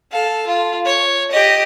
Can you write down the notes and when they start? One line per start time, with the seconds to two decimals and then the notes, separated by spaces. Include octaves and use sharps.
0.11 A4 F5
0.47 F4
0.85 C#5
1.31 G4 D#5